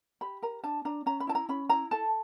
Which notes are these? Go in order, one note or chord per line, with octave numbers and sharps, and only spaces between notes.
G4 B5
A#4 A#5
D4 A5
D4 A#5
C#4 A#5
B5
E4 A5
A#5
C#4 B5
E4 A#5
A4 A5